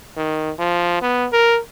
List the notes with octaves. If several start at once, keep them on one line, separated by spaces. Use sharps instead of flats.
D#3
F3
B3
A#4